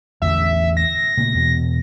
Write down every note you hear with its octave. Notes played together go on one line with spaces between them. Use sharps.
A1 E2 D3 E5
A#6
A#2 C#3 A3
E2 B2